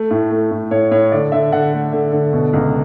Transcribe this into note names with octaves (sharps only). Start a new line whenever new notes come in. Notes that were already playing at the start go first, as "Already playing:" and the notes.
Already playing: A3
A2
A3
A2
A2 C#5
A2 C#5
D3 D5
D3 E5
D3 F#5
A3
D3
D3
B2
C#2